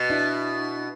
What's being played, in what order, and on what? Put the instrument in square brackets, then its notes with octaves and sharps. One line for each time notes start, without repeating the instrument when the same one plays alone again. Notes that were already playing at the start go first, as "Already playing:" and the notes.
Already playing: [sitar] B2
[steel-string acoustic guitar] D4 E4